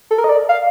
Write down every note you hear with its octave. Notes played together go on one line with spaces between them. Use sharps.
A4
A#4
D#5
D5
F5